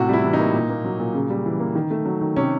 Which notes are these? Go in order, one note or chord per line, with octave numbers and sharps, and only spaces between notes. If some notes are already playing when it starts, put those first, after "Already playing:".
Already playing: A2 C3 F#4
G3 E4
E3
D#4
A#3
A#2
A#3
F#3
A#2
C#3
G3
E3
A#3
D#3
A3
F#3
D#3
C3 C#4